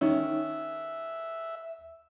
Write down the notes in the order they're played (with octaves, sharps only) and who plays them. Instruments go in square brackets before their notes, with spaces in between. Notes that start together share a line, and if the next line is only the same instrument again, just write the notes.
[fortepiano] D#3 C#4 [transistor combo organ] E5